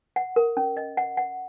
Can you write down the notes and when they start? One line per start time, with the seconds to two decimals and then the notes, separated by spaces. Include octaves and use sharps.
0.16 F#5
0.36 A#4
0.57 C#4
0.77 D#5
0.97 F#5
1.17 F#5